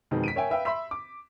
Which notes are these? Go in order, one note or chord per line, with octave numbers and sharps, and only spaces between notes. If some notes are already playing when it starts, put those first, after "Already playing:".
F2 B2 D#3 G#3 B3
B6 D7 D#7
A#4 C#5 E5 G5 G#5
B4 E5 F5 G5
E5 B5 C6 E6 B6
D6